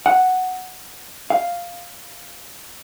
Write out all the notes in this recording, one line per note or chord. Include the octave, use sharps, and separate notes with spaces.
F#5
F5